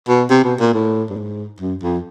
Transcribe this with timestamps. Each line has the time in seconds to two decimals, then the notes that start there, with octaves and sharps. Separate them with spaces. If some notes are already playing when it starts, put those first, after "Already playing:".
0.09 B2
0.30 C3
0.44 B2
0.60 A#2
0.74 A2
1.10 G2
1.17 G#2
1.60 F#2
1.83 F2